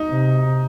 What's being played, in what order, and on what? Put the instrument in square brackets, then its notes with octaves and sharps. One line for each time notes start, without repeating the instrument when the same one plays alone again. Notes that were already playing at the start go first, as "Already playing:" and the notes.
Already playing: [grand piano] D#4
[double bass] C3